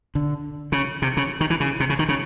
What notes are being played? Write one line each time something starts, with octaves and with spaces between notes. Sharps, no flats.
D3
C#3
C3
C#3
D#3
E3
C#3
C3
C#3
D#3
C#3